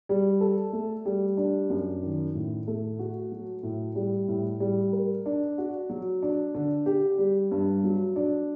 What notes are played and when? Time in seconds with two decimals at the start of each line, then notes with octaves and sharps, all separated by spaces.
0.09 G3
0.41 A4
0.73 A3
1.06 G3
1.37 D4
1.70 F#2
2.03 D#3
2.35 A2
2.67 A3
2.99 F#4
3.32 F#3
3.63 A2
3.95 G3
4.28 A2
4.60 G3
4.93 A#4
5.26 D4
5.58 F#4
5.89 F#3
6.23 D4
6.55 D3
6.86 G4
7.18 G3
7.51 G2
7.84 F#3
8.16 D4